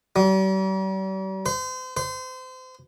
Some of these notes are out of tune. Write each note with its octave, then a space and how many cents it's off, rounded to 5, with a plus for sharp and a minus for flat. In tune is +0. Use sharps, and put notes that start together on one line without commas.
G3 -45
C5 -35
C5 -30